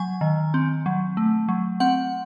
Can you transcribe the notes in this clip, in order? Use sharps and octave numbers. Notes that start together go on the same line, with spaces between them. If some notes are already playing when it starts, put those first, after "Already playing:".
Already playing: F#3 G#5
D#3
C4
F#3
A3
F#3
C4 F#5